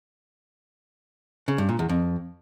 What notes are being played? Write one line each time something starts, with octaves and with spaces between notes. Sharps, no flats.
C#3
G2
A#2
E2
F2